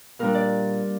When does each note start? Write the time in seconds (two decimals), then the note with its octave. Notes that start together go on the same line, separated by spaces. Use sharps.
0.19 A#2 G3 D4 A#4
0.34 D5